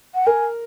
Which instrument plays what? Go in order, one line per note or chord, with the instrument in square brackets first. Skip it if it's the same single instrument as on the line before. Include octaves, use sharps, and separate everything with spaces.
[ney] F#5
[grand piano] A#4 [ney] G#5